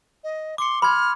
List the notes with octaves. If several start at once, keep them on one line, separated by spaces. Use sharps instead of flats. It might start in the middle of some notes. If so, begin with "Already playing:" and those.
D#5
C6 D6 C#7
B5 C6 F6 G#6